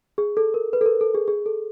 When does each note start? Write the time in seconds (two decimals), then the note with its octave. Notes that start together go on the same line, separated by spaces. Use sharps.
0.18 G#4
0.37 A4
0.54 A#4
0.73 B4
0.81 A4
0.86 A#4
1.01 A4
1.14 G#4
1.28 G#4
1.46 A4